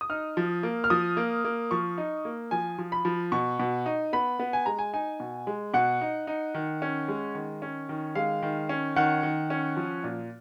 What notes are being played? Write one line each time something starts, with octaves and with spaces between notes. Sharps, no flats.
D#6
D#4 F6
F3
A#3
F6
F3 D#6
A#3
A#3
F3 C#6
D#4
A#3
F3 G#5
F3
B5
F3
B2 C#6
B2
D#4
B3 B5
B3
G#5
G#3 A#5
G#5
D#4 G#5
B2
G#3
B2 F#5
D#4
D#4
D#3
C#4
G#3
D#3
C#4
D#3
G#3 F5
D#3
C#4
D#3 F#5
D#3
C#4
F3
A#2